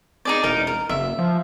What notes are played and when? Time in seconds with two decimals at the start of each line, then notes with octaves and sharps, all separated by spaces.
0.25 D#4 G#4 D5
0.44 E1 D#4 A#4
0.67 A#4
0.89 F#1 E5
1.19 F3